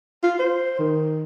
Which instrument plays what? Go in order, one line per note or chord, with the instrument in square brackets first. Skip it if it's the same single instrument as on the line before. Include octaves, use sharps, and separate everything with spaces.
[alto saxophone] F4
C5
D#3